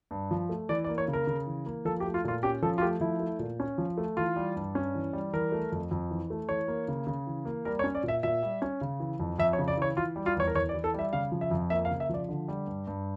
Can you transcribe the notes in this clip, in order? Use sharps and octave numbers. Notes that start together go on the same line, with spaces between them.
G2
F3
A3
E3 D5
D5
A#3
C#5
C#3
A#4
C#3
E3
A#3
F3 A4
G4
A3
F4
A#2 F4
C#4 G4
F3 A4
F4
A3 G4
F3 E4
A3
A#2
C#4
F3
A3
E3 F4
G3
G2
C#4
E3
G3
E3 A#4
A3
F2
F2
E3
A3
E3 C#5
A#3
C#3
C#3
E3
A#3
G3 A#4
C#5
C#4
D5
A#2
E5
A#2 E5
G3
C#4
C#3
E3
F2
F2 E5
C#5
C#3
D5
E3 C#5
E3 F4
G3
F4
E2 C#5
A#4
E2 C#5
D5
E3
A4
G3 E5
C#3 F5
F3
E5
F2
A#3 E5
F5
C#3
E5
F3 D5
D3
G3
G2
G2